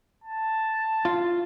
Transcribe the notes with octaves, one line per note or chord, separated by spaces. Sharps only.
A5
F4